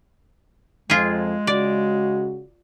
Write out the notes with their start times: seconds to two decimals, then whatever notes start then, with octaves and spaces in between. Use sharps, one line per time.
0.90 F2 G#3 F4 G#4
1.47 C#3 F#4 D5